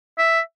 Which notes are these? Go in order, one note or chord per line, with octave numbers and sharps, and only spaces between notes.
E5